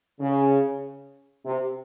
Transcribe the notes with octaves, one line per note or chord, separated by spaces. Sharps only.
C#3
C3